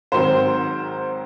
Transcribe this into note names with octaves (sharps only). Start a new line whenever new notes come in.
G#2 D#3 F#3 C4 C5